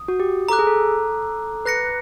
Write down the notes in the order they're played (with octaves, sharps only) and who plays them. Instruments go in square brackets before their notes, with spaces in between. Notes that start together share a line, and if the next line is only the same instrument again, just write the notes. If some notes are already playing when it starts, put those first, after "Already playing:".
Already playing: [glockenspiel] D#6
[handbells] F#4
G4
[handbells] A4 [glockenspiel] A#5 D6 F#6
[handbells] G#4
A4
[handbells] B4 [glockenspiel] F#6 A#6 C#7